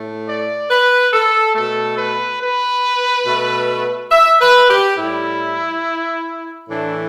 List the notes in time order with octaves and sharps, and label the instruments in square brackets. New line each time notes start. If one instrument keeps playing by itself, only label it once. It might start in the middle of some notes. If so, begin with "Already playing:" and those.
Already playing: [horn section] A2 A3
D5
B4
A4
B2 A3 A4
B4
B4
B2 A3
E5
B4
G4
A2 G3 E4
A2 E3 A3 D4